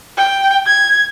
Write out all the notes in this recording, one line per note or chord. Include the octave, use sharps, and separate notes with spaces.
G5
G#6